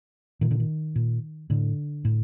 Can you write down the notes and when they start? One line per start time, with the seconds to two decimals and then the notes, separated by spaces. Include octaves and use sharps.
0.41 A#2 D#3
0.51 D3
0.60 D#3
0.96 A#2
1.50 A2 D3
2.05 A2